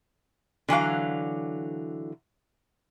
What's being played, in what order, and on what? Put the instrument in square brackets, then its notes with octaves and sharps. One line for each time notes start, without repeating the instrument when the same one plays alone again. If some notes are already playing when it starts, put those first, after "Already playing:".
[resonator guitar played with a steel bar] D3 E3 F#3 F5